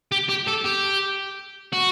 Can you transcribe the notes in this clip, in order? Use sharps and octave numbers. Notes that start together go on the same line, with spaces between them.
G4
G4
A4
G4
F#4